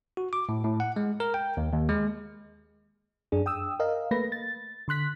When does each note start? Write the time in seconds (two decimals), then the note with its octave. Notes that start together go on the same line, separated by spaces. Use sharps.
0.17 F#4
0.33 D6
0.49 A2
0.64 A2
0.80 F#5
0.96 G#3
1.20 A#4
1.34 G5
1.57 D#2
1.72 D#2
1.89 G#3
3.32 F#2 D4 G#4
3.46 G5 D#6 E6
3.80 A#4 D#5 F5
4.11 A3 A#3 B4 A#6
4.32 A6
4.88 D3 C6 F#6 B6